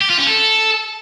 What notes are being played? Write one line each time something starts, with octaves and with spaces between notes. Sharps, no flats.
G4
F4
C#4
A4